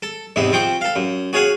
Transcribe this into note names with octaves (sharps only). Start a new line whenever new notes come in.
A4
E2 G#2 C3 E5
F3 C4 G5 C#6
A4 F5
F#2
F#4 G#4 C#5 F5 F#5 G#5